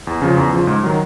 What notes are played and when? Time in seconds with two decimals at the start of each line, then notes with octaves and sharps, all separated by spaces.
0.07 E2
0.22 C#3 F3
0.37 E2
0.53 C#3 F3
0.67 G#2
0.83 D#3 F#3